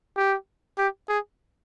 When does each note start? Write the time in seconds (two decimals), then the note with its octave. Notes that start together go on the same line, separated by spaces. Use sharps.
0.17 G4
0.78 G4
1.09 G#4